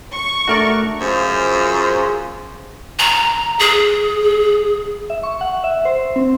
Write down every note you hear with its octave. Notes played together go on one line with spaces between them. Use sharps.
C#6
A3 D4 F#4 A#4 D5
F#2 F4 G#4 C5
A#5
G#4
E5
C#6
F#5
E5
C5
C4